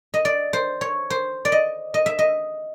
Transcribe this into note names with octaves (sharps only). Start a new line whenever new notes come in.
D#5
D5
C5
C#5
C5
D5
D#5
D#5
E5
D#5